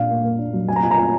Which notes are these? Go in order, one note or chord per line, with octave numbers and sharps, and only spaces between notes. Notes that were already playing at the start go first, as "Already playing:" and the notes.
Already playing: A#2 D4 F5
A#3
A#3
D4
F#3
F#3 G#5
A#5
F4 G#5
A#5
F4 G#5